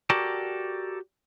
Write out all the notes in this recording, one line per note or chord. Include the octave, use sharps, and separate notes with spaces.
F#4 G4 A4 A#4 D5